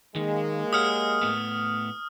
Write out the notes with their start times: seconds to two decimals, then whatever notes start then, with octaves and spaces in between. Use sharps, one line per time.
0.16 D#3 G#3 A#3
0.73 G4 C#5 F#5 D#6 F6
1.22 A2 A3 B3